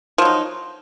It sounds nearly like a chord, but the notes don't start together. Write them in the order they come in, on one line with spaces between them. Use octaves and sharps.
F3 F#3 D#4